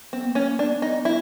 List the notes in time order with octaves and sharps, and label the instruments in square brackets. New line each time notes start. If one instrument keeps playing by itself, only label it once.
[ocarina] B3 [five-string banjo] C4
[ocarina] A#3
[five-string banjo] C#4
[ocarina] A#3
[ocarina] B3 [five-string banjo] D4
[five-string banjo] D#4
E4